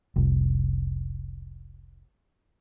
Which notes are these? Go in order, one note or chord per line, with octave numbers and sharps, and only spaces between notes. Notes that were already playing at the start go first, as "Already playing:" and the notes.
F1 C2